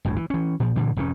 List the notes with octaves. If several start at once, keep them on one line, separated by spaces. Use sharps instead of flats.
G1 D2 A2
E3
E3 C#4
A#2 F3
G2 A#2 D3 E3
F1 G#2 C3 C#4